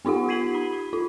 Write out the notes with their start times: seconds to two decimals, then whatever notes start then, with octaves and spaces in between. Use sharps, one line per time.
0.05 B3 D#4 F4 G4 F#5
0.29 G#6 B6 C7 D#7 F#7
0.55 B5
0.93 F4